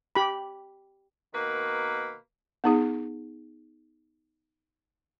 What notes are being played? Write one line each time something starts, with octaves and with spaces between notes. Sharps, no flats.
G4 B5
B2 D#3 A#3 B4
B3 D#4 G#4